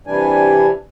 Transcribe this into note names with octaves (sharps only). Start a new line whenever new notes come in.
C3 E3 G3 D4 G#5